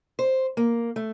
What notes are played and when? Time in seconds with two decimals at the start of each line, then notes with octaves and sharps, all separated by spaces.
0.19 C5
0.57 A#3
0.96 A3